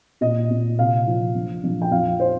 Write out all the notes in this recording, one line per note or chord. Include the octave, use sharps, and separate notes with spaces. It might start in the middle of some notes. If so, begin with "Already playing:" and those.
A#2 D#5
A#2
C3 F5
F3
A#1
A#1
G5
F2 F5
C5